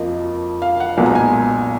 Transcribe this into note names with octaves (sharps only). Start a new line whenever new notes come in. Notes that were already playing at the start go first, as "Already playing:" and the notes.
Already playing: F2 F3 A#3 D#5
F5
F#5
B1 A#2 G#3 B3 G#5
A#5
G#5